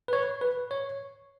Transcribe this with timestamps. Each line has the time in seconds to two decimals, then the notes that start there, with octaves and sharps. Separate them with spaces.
0.08 B4
0.13 C#5
0.41 B4
0.71 C#5